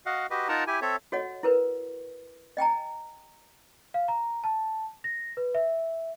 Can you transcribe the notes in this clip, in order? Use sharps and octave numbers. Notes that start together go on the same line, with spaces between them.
F#4 D#5 F5 F#5
F#4 G4 B4 D#5
D#4 F4 A#4 F#5 A5 A#5
E4 G4 G#5
C4 A4 C#5 E5
F#4 A4 C#5 D#5 F#5
E4 A#4 B4
D#5 G5 G#5 A#5
F5
A#5
A5
A#6
B4
E5